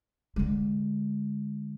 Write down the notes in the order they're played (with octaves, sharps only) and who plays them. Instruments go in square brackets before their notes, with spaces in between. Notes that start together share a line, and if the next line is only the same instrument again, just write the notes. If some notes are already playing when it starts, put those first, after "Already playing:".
[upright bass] D3 G#3